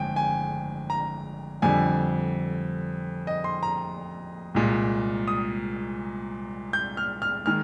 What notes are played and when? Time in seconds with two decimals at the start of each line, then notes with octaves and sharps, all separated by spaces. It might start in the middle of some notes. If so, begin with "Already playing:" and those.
Already playing: G1 F2 G#3 G5 G#5
0.16 G#5
0.90 A#5
1.62 F2 D3 G3 G#5
3.27 D#5
3.44 C6
3.63 A#5
4.54 C2 A#2 G#3
5.28 D#6
6.73 G6
6.97 F6
7.22 F6
7.46 D#3 G#3 F6